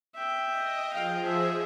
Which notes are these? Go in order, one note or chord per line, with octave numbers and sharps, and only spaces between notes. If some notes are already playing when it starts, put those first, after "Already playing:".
E5 G5
D#5
F3 G#4 F5 G5
E5